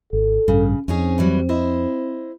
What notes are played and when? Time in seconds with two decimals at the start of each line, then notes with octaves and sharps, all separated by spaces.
0.13 G#1 A4
0.48 A1 G2 C#3
0.88 F2 C4 C#4 D#4 G#4
1.18 E3 F#3 G3
1.49 E4 C5 D#5